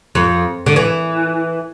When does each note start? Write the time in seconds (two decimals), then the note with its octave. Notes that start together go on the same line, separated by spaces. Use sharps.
0.15 F2
0.66 D3
0.76 E3